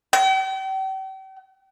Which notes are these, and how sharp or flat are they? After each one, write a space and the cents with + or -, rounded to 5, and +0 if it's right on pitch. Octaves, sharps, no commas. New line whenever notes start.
G5 -40